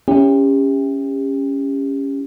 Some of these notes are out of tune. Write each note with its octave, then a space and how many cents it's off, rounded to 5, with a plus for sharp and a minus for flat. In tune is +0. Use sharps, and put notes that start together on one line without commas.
C#4 +0 E4 +0 G4 +35